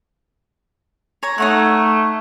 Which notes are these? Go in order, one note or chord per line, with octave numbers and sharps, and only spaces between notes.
C#5 A#5
A3 D#4 C#5 F#5